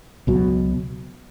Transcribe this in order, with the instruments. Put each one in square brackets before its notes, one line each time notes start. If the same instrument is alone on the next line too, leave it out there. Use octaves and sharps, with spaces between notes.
[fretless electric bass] C#2 B2 F#3